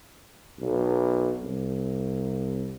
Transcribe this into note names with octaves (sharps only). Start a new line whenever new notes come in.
B1
C2